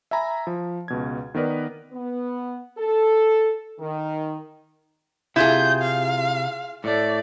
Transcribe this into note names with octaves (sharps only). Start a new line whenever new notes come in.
E5 G#5 A#5 B5
F3
C#2 B2 G#6
D#3 B3 A#4 B4 D5
B3
A4
D#3
C3 E4 F4 G#4 G6
F5
A2 A3 D5